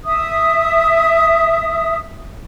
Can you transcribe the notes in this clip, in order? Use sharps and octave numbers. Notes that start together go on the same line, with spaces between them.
E5 D#6